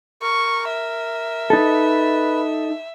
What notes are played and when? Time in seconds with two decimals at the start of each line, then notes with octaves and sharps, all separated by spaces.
0.22 A#4 C#6
0.70 E5
1.50 D#4 A4 B4